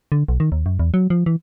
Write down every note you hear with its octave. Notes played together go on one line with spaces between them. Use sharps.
D3
B1
D#3
D#2
F#2
E2
F#3
F3
E3